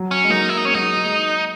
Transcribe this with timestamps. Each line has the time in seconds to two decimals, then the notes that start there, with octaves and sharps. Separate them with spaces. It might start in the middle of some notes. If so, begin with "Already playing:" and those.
Already playing: F#3
0.11 C#4
0.25 G#3
0.30 F#3 A#3 D#4
0.49 E4
0.57 D#4
0.65 G#3 C#4
0.74 F#3 D#4
0.84 G#3
0.97 F#3
1.06 G#3